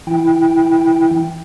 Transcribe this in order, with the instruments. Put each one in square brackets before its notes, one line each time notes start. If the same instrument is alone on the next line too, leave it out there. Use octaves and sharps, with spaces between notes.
[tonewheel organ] E3 E4 G5